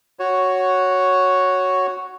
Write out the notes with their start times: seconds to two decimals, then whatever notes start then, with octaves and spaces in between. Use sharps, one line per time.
0.19 F#4 C#5